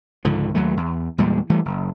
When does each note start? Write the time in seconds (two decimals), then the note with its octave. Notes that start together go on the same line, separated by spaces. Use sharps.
0.25 C#2 G#2 D3 F3
0.55 D#2 F#3 A3
0.77 E2
1.18 E2 A#2 G3 G#3
1.50 E3 G3 A3
1.65 F#1